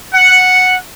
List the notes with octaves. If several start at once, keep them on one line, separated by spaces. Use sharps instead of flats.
F#5